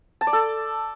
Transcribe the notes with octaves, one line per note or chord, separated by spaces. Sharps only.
A5
D5
A4